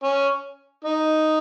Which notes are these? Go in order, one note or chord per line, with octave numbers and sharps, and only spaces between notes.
C#4
D#4